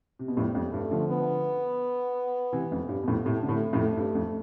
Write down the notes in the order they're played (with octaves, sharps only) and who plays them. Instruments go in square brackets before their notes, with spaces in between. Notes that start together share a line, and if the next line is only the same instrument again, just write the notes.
[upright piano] C3
B2
[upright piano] F2 A2 [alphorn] G3
[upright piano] F2
[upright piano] G2 [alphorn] A3
[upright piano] D3 F3
[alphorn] B3
[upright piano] C3 E3
F2
G2
B2
F2 A2
[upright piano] A2 C3 [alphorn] A3
[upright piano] D3
A2 C3
F2 A2
G2
F2